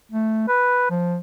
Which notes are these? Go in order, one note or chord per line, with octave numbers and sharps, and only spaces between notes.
A3
B4
F3